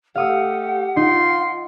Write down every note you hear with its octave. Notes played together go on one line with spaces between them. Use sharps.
A3 G4 F5 F#5 D#6 E6
D#4 F4 C6